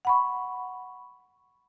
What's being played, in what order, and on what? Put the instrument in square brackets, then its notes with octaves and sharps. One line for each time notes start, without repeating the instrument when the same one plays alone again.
[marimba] F#5 B5 C#6